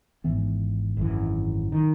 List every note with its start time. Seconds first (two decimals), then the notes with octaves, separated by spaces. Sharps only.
0.24 G#1 G#2 E3 B3
0.97 G#1 F#2 E3
1.72 D#3